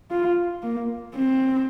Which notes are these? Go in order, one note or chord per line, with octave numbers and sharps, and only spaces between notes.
F4
A#3
C4